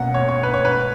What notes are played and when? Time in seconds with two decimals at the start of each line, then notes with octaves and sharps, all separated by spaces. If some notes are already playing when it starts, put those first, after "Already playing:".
Already playing: B2 A#3 C#4 F#5
0.14 C#5
0.29 C#5
0.43 B4
0.54 C#5
0.65 B4